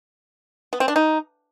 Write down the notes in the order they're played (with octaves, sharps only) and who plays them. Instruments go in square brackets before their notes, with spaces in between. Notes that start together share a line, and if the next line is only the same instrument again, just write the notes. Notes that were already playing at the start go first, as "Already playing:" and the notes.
[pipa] B3
C4
D4
D#4